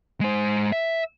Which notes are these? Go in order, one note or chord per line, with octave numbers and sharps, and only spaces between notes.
G#3 C5
E5